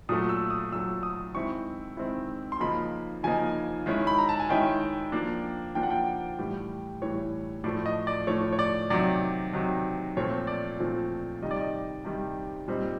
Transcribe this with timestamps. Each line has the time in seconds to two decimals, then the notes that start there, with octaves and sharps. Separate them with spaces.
0.09 A#2 F#3 A3 D#6
0.29 E6
0.50 D#6
0.72 A#2 F#3 A3 E6
1.03 D#6
1.34 D#3 G#3 C4 E4 C#6
1.97 D#3 G#3 C4 E4
2.52 C6
2.60 C#3 F3 A#3 D#4 B5
3.23 C#3 F3 A#3 D#4 G#5
3.86 D#3 G#3 C#4 E4
4.07 B5
4.18 A#5
4.29 A5
4.40 G#5
4.49 D#3 G#3 C#4 E4 G5
5.12 F3 A#3 D4
5.75 F3 A#3 D4 G5
5.83 F#5
5.90 G5
6.39 A2 E3 G3
7.02 A2 E3 G3 C#5
7.64 A2 F3 A3 D5
7.86 D#5
8.07 D5
8.27 A2 F3 A3 C#5
8.52 C#5
8.59 D5
8.90 C3 D#3 F#3 D5
9.53 C3 D#3 F#3
10.16 A#2 F3 A3 C4 C#5
10.47 D5
10.79 A#2 F3 A3 C4
11.42 C3 D#3 G3 D#5
11.51 D5
11.60 D#5
12.05 C3 D#3 G3
12.68 A#2 G3 C4 D#4